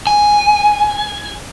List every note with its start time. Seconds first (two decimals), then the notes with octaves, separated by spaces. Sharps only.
0.07 G#5